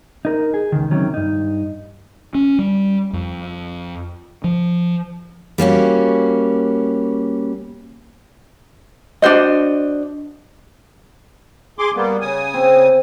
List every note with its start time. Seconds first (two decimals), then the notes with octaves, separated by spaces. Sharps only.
0.25 D#4 A#4
0.54 G#4
0.72 C#2 D#3
0.91 C3 D#3 F#3 C#4
1.14 G2 D#4
2.35 C#4
2.59 G3
3.13 F2
4.44 F3
5.58 G3 A#3 C#4 F#4
9.22 D4 F#4 C5 D#5
11.79 G#4 C6 D6
11.95 G3 A#3 B3
12.21 C#3 G#5 D#6
12.54 C4